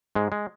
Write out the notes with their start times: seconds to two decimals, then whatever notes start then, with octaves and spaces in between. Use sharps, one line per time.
0.15 G#2 G#3
0.32 G#3